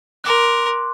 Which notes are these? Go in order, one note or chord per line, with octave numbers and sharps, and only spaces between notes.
A#4 C6 D6 F#6